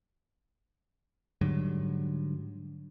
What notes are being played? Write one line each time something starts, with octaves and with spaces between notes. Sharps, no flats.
G#2 D3 F#3 G3